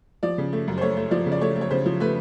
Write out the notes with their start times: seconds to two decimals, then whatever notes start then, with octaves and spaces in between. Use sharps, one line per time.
0.23 F3 D5
0.38 C#3
0.53 A3
0.68 F#2
0.78 C5
0.81 A3 C#5
0.97 A3
1.11 F3 D5
1.26 C#3
1.32 D5
1.41 A3 C#5
1.56 A3
1.61 C#5
1.71 C#3 C5
1.86 F3
2.00 A3 B4